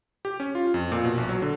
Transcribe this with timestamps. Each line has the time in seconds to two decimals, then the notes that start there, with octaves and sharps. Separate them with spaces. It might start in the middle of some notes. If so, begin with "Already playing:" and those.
0.25 G4
0.40 C#4
0.55 F4
0.74 F2
0.92 A#2
1.05 B2
1.18 A#1
1.29 F#3
1.42 D3